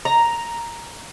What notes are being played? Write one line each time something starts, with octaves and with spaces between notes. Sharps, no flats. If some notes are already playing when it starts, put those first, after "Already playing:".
A#5